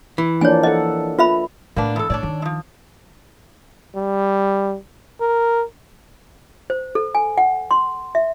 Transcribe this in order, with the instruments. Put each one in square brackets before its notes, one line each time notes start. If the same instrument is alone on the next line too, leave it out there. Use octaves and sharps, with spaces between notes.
[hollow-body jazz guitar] E3
[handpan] F3 A#3 D4 [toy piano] C#5 G#5
[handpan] A4 F#5 [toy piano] D#5
[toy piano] F4 E5 B5 [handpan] B4
[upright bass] A2 [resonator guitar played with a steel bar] A#3 B3 D4
[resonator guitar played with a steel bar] E2 A4
[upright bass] A2 [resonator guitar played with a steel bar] D4 C#5 D5
[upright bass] D#3
[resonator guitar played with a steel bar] F3 G#3
[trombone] G3
A#4
[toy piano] C5
A4
G#5
F#5
C6
E5